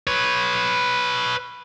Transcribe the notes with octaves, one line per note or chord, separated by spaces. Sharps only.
B4 C#5